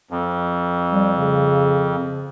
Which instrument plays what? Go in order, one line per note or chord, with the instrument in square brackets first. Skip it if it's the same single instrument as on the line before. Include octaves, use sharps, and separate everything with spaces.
[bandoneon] F2
[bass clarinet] G3
C#3
C#3